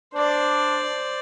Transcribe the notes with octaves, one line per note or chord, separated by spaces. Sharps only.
D4 C5 D5